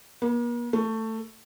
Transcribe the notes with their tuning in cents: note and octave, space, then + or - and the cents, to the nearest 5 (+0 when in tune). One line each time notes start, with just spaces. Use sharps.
A#3 +45
A3 +15